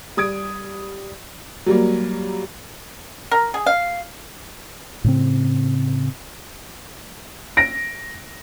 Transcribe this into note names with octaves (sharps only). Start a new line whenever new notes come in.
G3 D#6 G#6 D7
F#3 G3 A#3
A#4
G#4
F5
A2 C#3 C4
A#6 D7